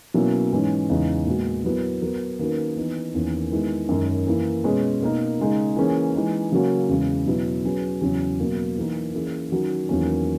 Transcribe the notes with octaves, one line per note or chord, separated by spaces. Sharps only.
B2 F#3 A#3 C#4 E4
G#2 E3 G#3 C#4
E2 C#3 G#3 D#4
A#2 G#3 B3 F#4
F#3 B3 E4 A#4
F#3 B3 F#4 A#4
D#3 A#3 C#4 F#4 B4
E3 B3 D#4
E2 D#3 A#3 C#4
D#3 G#3 B3 E4
F#2 D#3 G#3 C#4
E3 A#3 E4
B2 G#3 C#4 G#4 B4
B2 A#3 D#4 A#4
C#3 G#3 D#4
E3 A#3 C#4 G#4
E3 G#3 D#4
C#3 F#3 A#3 C#4 F#4
E2 C#3 G#3
B2 F#3 B3 E4
F#3 C#4 G#4 B4
E2 C#3 F#3 C#4
B2 F#3 A#3
E3 A#3 D#4 A#4
E3 A#3 C#4 E4 G#4
D#3 F#3 C#4 F#4 A#4
E2 D#3 F#3 A#3 C#4